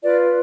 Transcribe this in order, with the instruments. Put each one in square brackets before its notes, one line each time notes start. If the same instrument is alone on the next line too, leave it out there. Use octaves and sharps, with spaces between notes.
[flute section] F4 B4 D5